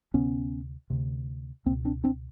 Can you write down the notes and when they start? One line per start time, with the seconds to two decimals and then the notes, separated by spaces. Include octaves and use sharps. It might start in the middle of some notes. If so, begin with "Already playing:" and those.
0.14 D2 C3 B3 C#4
0.90 D2 C3
1.66 C#2 A#3 C4
1.70 B2
1.85 C4 D4
2.04 C4 D4